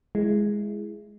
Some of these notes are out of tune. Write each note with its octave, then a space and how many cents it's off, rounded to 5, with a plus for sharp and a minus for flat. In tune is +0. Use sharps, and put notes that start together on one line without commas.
G#3 +0 E4 +20